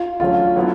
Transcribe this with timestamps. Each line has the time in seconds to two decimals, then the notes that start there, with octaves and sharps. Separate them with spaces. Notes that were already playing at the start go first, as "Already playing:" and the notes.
Already playing: F4
0.20 D3 F#3 A3 C#4 F4
0.56 D3 F#3 B3 E4